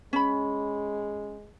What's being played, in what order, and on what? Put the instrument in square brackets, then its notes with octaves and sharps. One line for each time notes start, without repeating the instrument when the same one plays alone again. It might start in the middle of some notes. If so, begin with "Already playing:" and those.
[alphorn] G#3 [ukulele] C#4 B5